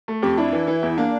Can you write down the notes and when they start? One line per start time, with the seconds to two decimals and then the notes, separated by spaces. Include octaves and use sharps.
0.08 A3
0.22 F2 G4
0.38 D4 E4
0.52 E3
0.67 E3
0.83 E2
0.97 A#3 D4